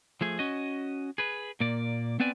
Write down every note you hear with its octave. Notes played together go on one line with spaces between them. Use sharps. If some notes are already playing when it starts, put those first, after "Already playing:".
F3 A3 G#4
C#4 F#4 D#5
G#4 B4
A#2 A#3 D5
B3 C4 B4 D5 G#5